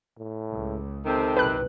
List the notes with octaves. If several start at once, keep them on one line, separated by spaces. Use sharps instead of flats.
A2
C#2
C3 D#3 C4 A4
F#1 C2 A#2 B4 F#6